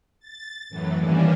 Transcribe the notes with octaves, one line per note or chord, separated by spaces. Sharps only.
A6
F#2 A2 E3 F#3
D#3 E3 G3 A#3 C#4 D4